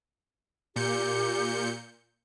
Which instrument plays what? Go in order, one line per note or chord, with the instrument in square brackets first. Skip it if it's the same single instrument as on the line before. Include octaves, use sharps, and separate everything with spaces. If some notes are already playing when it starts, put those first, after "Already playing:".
[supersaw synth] A#2 G6 C#7 [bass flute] G4